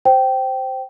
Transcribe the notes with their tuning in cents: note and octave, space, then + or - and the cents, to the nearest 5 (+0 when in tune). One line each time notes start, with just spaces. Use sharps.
C5 +0 G5 -15